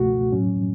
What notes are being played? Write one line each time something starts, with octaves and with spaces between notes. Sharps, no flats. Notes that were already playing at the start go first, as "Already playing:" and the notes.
Already playing: C#2 B2 A3 F#4
A2 F#3 C#4